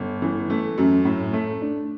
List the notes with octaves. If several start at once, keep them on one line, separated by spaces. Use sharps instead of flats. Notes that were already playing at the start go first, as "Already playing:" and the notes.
Already playing: G1
E3
A3
F#2
A2
A3
D4